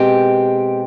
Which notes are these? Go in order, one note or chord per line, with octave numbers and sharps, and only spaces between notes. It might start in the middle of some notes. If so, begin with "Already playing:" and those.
Already playing: B2 G#3 C4 G4